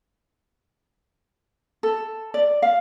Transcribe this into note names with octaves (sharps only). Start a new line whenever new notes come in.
A4
D5
F5